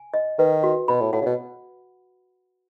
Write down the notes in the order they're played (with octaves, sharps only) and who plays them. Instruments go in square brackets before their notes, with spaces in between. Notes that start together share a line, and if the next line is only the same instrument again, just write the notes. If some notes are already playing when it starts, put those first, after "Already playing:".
Already playing: [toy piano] G#5
D#5
[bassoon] D#3 [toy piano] B4
[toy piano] F#4
[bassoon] B2 [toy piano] B5
[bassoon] A2
[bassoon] A2 [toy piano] F#5
[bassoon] C#3
B2